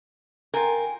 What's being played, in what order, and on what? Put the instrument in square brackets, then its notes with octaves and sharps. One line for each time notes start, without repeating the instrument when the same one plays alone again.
[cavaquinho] F4 G5 G#5 [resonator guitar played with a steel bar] A#4